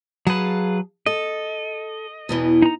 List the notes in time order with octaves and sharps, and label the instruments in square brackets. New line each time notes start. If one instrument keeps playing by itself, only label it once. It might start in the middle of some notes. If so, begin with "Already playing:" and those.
[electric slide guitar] F#3 B4 [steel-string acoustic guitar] G#4 F5 A5
[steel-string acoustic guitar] A4 [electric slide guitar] D#5
[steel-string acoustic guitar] E2 B2 E3
[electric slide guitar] D#4 A#5